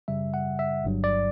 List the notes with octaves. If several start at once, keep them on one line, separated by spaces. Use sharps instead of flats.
F#2 C#3 G3 E5
F#5
E5
G1 G2 F#3
D5